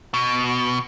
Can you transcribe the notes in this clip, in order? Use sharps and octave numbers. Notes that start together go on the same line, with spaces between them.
B2